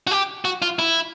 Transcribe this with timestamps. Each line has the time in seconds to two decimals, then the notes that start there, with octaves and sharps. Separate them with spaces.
0.07 F#4
0.11 G4
0.45 F#4
0.62 F4
0.79 E4